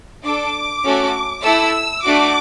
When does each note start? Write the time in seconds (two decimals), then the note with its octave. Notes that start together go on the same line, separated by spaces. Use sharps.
0.24 D4 A4 D6
0.84 A3 C#4 F#4 A4
1.44 A3 E4 A4 E6
2.04 A3 D4 F#4 D6